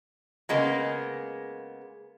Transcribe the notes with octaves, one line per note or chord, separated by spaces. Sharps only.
C#3 G#3 A#3 B3